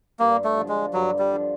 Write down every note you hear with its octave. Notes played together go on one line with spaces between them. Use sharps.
G2 A#3
A3
D3 F3
G#3
G2 F#3
G3
D3 F3